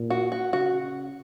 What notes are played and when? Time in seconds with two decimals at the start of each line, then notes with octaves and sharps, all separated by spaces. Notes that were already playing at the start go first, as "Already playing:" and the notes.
Already playing: A#2
0.10 F#4
0.32 F#4
0.53 C#3 F#4